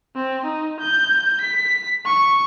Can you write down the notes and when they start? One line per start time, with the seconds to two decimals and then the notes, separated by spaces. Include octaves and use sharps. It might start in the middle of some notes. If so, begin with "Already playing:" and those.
0.15 C4
0.45 D#4
0.80 G6
1.41 B6
2.06 C#6